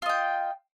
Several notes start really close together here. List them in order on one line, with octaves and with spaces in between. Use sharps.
F4 D#5 G5